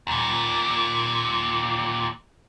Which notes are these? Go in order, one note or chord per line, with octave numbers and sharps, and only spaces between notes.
D#2 A#2